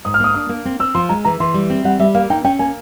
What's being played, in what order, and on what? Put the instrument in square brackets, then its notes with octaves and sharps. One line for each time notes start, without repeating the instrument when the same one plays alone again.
[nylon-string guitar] G#2 [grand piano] D#6
[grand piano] F6
[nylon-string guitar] A#3 [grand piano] D#6
[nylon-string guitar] D4 [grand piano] D#6
[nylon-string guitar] A#3
C4
[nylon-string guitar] C4 [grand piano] E6
[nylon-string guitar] F3 [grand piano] C6
[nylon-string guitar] G#3 [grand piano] A#5
[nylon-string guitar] E3 [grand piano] A#5
[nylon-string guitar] E3 [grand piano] C6
[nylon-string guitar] G3
C4
[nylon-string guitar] G3 [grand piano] F#5
[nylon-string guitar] G3 [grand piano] E5
[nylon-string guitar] A#3 [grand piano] F5
[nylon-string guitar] D#4 [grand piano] G5
[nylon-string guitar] C#4 [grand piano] G5
[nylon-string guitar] A#3 [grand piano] G#5